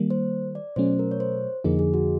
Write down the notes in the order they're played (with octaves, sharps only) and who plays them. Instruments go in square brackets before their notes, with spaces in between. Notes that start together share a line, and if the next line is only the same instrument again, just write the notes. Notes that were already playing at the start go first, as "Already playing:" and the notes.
Already playing: [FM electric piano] D#3 G3 A#3
[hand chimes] C5
D5
[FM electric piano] B2 F#3 A3 C#4 [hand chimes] C5
[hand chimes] A#4
C#5
C5
[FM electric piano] F2 D3 F3 A#3 D#4 [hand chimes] G#4
[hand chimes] G#4
F#4